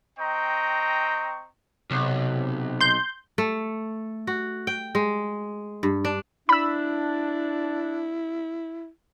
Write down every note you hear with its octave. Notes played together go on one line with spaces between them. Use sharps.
C4 D#5 G5 A#5 C#6
B1 C3
C6 G6
A3
F#4
G5
G#3
G2
D4
D4 E4 B5 E6